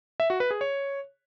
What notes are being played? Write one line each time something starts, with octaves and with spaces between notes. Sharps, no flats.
E5
F#4
B4
G#4
C#5